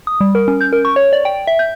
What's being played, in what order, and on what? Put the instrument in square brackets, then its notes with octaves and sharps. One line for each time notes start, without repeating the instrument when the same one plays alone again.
[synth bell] D#6
G3
A#4
C#4
G6
A#4
C#6
C#5
D5
G5
E5
G6